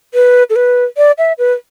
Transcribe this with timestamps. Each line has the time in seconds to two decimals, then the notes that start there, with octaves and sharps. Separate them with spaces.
0.14 B4
0.50 A4
0.56 B4
0.97 D5
1.18 E5
1.38 B4